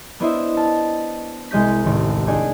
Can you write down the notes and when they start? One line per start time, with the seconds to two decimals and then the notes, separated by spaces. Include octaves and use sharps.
0.20 B3 D4 E4 C5 D#5 E5
0.57 A5 F6
1.51 C2 G#3 D#5 G6 B6
1.84 A1 D#2
2.27 D4 D#4 G#4